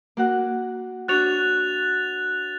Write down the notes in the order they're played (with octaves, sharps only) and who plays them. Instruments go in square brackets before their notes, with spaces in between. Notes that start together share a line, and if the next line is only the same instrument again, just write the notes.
[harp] A#3 F#4 F#5
[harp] D4 F#4 C#5 [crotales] F#6 A6 F7